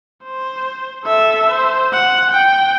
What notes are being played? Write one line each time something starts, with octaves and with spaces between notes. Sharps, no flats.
C5
A4 E5
C5
F#5
G5